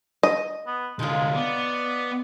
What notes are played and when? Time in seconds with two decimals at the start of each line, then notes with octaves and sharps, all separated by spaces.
0.23 D#5
0.67 B3
0.99 C2 D3 G#3 D#4 F4
1.35 B3 D5